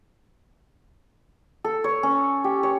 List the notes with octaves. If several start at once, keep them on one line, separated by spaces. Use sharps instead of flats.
A4
C#5
C#4
G4
C#5